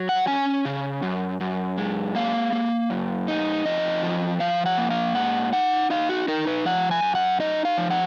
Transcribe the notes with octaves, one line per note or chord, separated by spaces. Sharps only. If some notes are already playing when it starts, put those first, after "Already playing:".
Already playing: F#3
F#5
C#4 G#5
C#3
F#2
F#2
G#3
A#3 F5
A#3
F#2
D#4
F2 D#5
F3
F3 F5
F#5
A#3
F5
G#2 F#5
D#4 F#5
D#4 F5
F#4
D#4 A#4
B4
F3 F#5
G#5
F#2
F#5
D#4 D#5
F5
F3
F#5